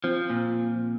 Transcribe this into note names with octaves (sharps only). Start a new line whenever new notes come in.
F3 C4
A#2